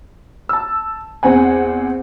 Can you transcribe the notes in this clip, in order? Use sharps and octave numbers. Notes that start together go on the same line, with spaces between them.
A5 E6
E2 C4 F#5 G#5